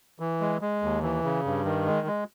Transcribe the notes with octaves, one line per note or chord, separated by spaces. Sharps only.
E3
G#3
G#3
D#2
E3
C#3
G2
D#3
G#3
G#3